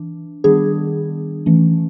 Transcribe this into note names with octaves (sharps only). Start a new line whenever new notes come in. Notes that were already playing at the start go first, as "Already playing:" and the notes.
Already playing: E3 D4
D#3 G3 B3 D4 G#4
E3 A3 C#4